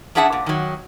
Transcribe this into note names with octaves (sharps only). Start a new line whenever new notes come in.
C#4 D4 G#4 E5 F#5 A5
A#2
D#3 F#3